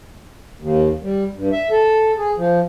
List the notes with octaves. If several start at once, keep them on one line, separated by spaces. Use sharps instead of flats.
D#2
G3
G2
E5
A4
G#4
F3